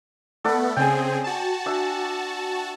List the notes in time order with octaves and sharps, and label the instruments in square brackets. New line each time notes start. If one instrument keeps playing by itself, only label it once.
[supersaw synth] A3 B3 [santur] A4 D5 F#5
[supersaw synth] C#3 C4 G#4 [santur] G5 G#5
[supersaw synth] F#4 A5
[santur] D4 E5